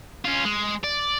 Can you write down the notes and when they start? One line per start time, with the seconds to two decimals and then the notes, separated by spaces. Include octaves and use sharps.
0.25 C#4 F4
0.45 G#3
0.84 D5